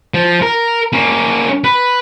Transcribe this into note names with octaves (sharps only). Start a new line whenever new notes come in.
F3
A#4
A#3 C#4
B4